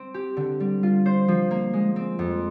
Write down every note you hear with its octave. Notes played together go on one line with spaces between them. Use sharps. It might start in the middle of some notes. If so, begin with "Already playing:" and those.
Already playing: C4
G4
D3
G3
F4
C5
F3
A#3
G#3
C4
F2